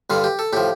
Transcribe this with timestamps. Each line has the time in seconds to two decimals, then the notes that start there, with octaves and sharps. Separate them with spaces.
0.10 G2 D3 G3 F4
0.24 G4
0.39 A4
0.53 A2 F3 G4